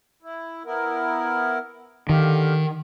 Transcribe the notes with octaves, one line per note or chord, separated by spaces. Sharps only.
E4
B3 E4 A#4
D3 D#3 G4 F5